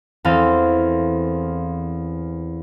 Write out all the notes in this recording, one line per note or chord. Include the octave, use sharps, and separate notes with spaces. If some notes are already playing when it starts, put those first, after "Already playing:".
E2 C4 A4 F5 C6 D#7